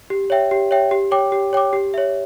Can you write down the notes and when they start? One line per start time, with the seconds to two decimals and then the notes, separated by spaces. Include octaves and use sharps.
0.10 G4
0.30 C#5 E5 G5
0.51 G4
0.71 C#5 E5 G5
0.91 G4
1.11 C#5 G5 D6
1.32 G4
1.53 C#5 G5 D6
1.73 G4
1.94 C#5 E5